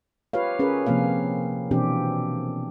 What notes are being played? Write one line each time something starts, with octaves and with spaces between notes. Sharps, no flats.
F4 G4 B4 C#5 F5
C#4 G#4 A#4 B4
C3 F3 A#3 C4 F5
B2 E3 C4 D4 G4